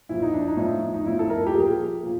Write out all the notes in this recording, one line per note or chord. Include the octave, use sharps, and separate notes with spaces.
A#2 F3 E4
D#4
D4
D#4
A2 F3
D#4
A2 F3 E4
A4
A#4
G4
A#2 F3 G#4
A#2 F3